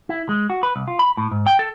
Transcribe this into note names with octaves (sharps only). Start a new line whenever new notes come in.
E4
G#3
F#4
B4
C2
F4
B5
A2
G#2
G5
A4